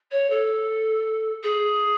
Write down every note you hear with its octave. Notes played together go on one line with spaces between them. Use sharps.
C#5
A4
G#4